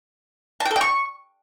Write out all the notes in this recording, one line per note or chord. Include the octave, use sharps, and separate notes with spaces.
A5
G5
A4
G5
C#6